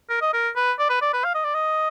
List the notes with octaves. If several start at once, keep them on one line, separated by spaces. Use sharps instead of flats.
A#4
D#5
A#4
B4
D5
B4
D5
B4
F5
D#5
D5
D#5